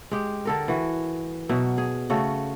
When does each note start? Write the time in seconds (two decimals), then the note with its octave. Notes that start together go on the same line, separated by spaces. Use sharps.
0.11 G#3 G4
0.45 D3 A4 A#4
0.68 E3 F#4
1.49 B2 F#3 E5
1.78 G#4
2.10 C#3 A3 F#4 A4